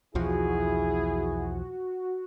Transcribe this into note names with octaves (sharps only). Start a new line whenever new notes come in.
B1 E2 F3 E4 F#4 G#4